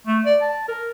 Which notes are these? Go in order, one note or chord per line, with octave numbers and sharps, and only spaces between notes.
A3
D5
A5
A#4